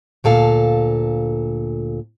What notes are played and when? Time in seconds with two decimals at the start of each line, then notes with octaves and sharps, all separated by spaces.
0.24 D2 A#2 A4 F5